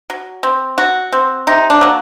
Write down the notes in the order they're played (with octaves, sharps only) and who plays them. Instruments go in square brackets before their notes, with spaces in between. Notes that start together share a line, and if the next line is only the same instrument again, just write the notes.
[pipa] F#3
C4
F#3 F#4
C4
C3 D#4
D4
F#3 A#3